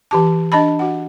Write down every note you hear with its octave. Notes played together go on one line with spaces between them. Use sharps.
E3 G4 A5
D4 D#5 A5 B5
F#4 F#5